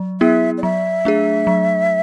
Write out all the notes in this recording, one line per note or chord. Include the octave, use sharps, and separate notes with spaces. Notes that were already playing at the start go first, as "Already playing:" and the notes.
Already playing: F#3
B3 E4 G#4 E5
D5
F#3 E5
A3 D4 G#4
F#3